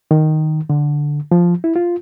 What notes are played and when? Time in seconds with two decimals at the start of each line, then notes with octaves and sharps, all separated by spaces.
0.11 D#3
0.70 D3
1.31 F3
1.64 E4
1.76 F4